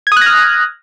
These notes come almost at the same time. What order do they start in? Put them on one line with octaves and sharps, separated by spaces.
G#6 D#6 F#6 A#6 F6